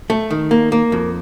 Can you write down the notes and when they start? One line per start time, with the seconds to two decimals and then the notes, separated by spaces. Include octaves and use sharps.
0.10 A3
0.31 D#3
0.51 A#3
0.72 A#3
0.92 F2